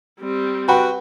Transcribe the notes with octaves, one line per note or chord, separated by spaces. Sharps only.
G3 C4
F#4 B4 G5 B5